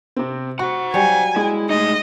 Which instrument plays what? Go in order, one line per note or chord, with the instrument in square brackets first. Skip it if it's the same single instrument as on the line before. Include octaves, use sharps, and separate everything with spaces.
[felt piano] C3 C4
[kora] F#4 [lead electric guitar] C5 F#5 [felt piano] C#6
[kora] F#3 G3 C#5 [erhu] G#5
[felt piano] G#3 [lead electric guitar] E4
[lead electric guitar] A3 D#4 [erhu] D#5